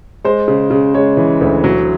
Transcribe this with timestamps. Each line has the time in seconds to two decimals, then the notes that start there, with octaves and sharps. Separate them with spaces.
0.24 G#3 C5
0.48 C#3
0.71 C#3
0.94 G#3 C#5
1.17 E3
1.41 D2
1.64 F#3